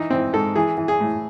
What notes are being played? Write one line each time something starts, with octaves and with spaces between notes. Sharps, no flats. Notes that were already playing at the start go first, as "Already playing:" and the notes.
Already playing: E3 D#4
E3 C4
G#2 A4
E3 G#4
E3
G#4
A2